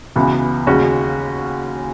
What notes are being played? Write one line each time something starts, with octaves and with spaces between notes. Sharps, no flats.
C#2 C#3 E3 B3 F#4
D#2 C#3 G#3 C#4 F#4